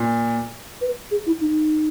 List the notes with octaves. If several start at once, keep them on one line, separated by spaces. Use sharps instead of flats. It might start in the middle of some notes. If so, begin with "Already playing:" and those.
Already playing: A#2
B4
G#4
E4
D#4